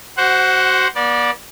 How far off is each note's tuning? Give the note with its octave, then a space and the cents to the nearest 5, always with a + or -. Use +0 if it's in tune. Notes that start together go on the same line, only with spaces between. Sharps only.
F#4 +25 C5 +0 F#5 +0
B3 -40 D5 +0